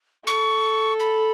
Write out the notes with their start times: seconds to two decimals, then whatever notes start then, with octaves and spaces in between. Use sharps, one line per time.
0.26 A4 C#6
1.00 B5